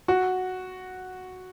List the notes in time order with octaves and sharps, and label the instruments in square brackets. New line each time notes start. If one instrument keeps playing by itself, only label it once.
[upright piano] F#4